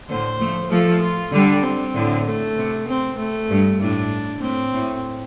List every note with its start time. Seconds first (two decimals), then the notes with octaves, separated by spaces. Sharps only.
0.08 A2 D3 C5
0.39 F3 A3
0.70 F3 A3 A4
1.03 F4
1.32 D3 G3 D4
1.63 C4
1.95 A2 D3
2.26 A3
2.57 C3
2.88 C4
3.18 A3
3.50 G2
3.81 A2 D4
4.42 A2 C4
4.74 A2